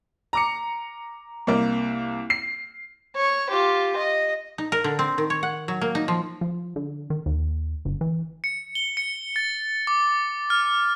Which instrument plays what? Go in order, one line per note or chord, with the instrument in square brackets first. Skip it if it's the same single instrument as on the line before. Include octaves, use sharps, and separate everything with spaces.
[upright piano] A#5 D6 C#7
C2 A#3
C7
[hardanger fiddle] C#5
F4 G4
D#5
[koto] D#4
A#4
D3
C4
D#3
C#5
F#5
F#3
A#3
D#4
F3
[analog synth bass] F3
D3
D#3
D#2
G1
E3
[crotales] C#7
G7
C#7
A6
D6
F6